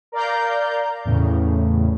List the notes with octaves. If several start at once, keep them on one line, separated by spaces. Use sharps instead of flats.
A#4 D5 F5 A#5 G6
E2 A2 C#3